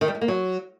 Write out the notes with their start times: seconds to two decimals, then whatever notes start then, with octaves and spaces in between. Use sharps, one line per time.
0.01 D#3
0.08 G3
0.15 G#3
0.21 A#3
0.28 F#3